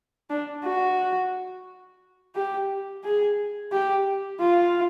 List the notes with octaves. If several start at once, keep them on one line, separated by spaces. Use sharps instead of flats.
D4
F#4
G4
G#4
G4
F4